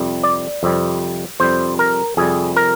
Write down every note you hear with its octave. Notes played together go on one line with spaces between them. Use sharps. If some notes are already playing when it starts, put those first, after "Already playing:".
Already playing: F2 C3 G3
D5
F2 C3 G3
F2 C3 G3 C5
A#4
F2 C3 G3 G#4
A#4